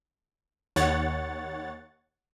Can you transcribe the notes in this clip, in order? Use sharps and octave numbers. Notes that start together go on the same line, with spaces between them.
D#2 C#5 F#5 A6